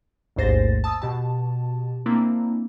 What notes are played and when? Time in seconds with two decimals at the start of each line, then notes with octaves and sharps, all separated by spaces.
0.36 A1 D#2 G#2 C5 A6 A#6
0.84 A5 D#6 E6 A6
1.02 B2 G4 A5
2.06 A#3 C4 D4 E4